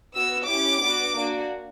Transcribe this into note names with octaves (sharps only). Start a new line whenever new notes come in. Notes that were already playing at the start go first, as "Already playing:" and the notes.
B3 F#4 E6
C#4 E4 G4 D6
B3 D4 F#4
A#3 D4 F#4